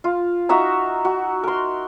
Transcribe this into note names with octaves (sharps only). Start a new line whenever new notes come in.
F4
D#4 F#4 E5 A#5
F#4
A#4 C6